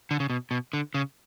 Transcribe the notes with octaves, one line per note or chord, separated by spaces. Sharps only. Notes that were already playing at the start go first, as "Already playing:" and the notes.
D3
C#3
B2
B2
D3
C#3